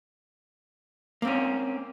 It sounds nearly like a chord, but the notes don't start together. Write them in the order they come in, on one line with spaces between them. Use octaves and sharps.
A#3 C4 C#4